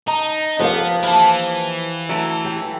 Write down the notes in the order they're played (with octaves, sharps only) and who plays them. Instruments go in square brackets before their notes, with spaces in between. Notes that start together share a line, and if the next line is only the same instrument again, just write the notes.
[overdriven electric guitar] D#4 [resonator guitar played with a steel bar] A#5
[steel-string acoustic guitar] F3 G4 F5 [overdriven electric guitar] B3
[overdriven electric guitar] E3 [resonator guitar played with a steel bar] A#3 A5
[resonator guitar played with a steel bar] F#3 A3 E4
[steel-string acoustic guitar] G4